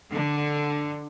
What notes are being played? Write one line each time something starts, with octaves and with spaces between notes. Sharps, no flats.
D3